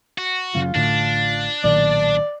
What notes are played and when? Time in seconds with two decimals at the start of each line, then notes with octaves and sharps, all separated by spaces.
0.18 F#4
0.55 F#1 F#2 C#3 F4
0.75 A1 A2 D3 D4
1.64 B1 A#2 D#3 D5